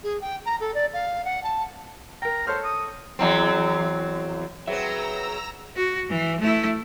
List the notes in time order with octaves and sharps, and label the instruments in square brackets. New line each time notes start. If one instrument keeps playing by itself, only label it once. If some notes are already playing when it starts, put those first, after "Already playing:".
[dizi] G#4
G5
A#5
A4
D5
F5
F#5
A5
[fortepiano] A#4 G5 [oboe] A#5
[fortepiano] A4 C#5 F6 [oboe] C5
[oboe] D#6
[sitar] E2 F#3 C4
[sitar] F#3 C4 [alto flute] G#4 [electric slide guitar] B4 E5 [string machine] A#5 E6 A#6
[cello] F#4
E3
A3 E4